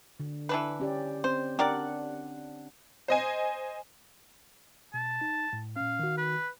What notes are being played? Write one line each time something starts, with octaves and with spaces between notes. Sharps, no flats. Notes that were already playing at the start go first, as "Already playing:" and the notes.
D3
E3 D4 B4
C#4 G4 D5
C4 C5
D4 G4 A#4 D5 F#5
C5 D#5 G#5
B2 A5
D#4
A2
A#2 C#4 F5
D#3 F#4
B4